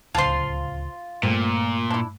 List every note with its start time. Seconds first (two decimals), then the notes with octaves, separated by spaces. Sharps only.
0.15 D1 C#2 F4 C5 A5 C6
1.23 G2 A#2 A3 C4
1.90 D4 E4